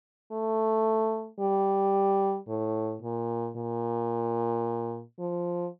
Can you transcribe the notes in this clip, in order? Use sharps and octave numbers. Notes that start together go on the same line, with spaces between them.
A3
G3
A2
A#2
A#2
F3